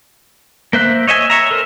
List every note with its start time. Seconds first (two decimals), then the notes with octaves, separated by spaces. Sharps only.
0.73 A#3 C5 E5 F#6
1.07 C#5 D#5 E5 G#5
1.30 C#5 E5 A#5
1.51 A4 A#4 C5